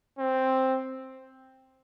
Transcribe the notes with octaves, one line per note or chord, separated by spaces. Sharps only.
C4